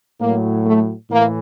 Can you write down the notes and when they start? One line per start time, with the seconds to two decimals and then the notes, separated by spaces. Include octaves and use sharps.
0.20 A2 F#3 A#3
0.64 A3
1.10 A2 E3 A#3